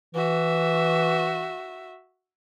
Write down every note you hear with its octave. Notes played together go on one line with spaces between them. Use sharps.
E3 F#4 E5